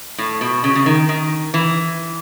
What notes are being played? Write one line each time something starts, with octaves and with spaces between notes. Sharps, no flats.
A2
B2
C#3
C#3
D#3
D#3
E3